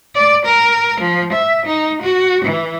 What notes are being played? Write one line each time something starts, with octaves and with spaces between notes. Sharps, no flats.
D5
A#4
F3
E5
D#4
F#4
E3